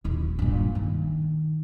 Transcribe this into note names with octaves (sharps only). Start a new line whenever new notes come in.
D#1 A1
G2 A#2
D#3